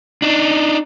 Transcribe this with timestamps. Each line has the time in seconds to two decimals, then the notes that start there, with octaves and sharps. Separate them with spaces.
0.22 D4 D#4